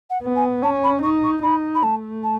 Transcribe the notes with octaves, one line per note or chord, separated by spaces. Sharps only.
F#5
B3
G#5
C#4 A5
B5
D#4 C#6
C#6
D#4 B5
B5
A3 A5
A5